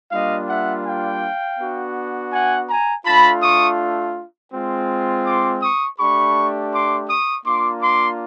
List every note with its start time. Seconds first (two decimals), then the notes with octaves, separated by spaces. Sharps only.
0.12 G3 A#3 D4 F4 D#5 F5
0.49 E5 F#5
0.86 F5 G5
1.58 B3 D4 F#4
2.32 F#5 G#5
2.68 G#5 A#5
3.05 A3 D4 F4 A5 B5
3.42 C#6 D#6
4.52 G#3 C4 F4
5.25 C6 D6
5.62 C#6 D#6
5.99 A3 D4 G4 B5 C#6
6.72 C6 D6
7.09 C#6 D#6
7.46 A#3 D4 F4 C6 D6
7.82 C6 D6